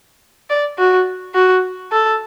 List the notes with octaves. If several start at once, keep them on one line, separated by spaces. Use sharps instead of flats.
D5
F#4
F#4
A4